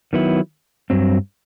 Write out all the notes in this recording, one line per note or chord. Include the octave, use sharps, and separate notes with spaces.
D#3 F#3 B3 E4
G2 F#3 C4